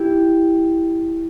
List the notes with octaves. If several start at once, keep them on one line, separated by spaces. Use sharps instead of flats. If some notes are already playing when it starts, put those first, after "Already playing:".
Already playing: E4 G4